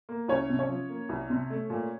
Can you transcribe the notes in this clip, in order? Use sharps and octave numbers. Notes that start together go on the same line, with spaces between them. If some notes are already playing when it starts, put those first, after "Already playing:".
A#3
C2 C#4 C#5
C3
C#4 C#5
F3
A#3
C2
C3
A3
A#2